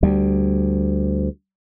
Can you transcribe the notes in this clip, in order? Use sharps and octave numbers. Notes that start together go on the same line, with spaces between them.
D2 G3